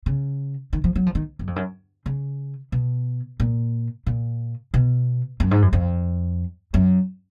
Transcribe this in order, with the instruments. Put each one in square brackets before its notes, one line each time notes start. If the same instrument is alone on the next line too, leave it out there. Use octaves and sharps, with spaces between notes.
[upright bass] C#3
D#3
F3
F#3
F3
D#3
F#2
F2
F#2
C#3
B2
A#2
A#2
B2
F#2
G#2
F#2
F2
F#2